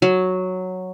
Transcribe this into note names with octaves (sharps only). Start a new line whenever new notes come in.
F#3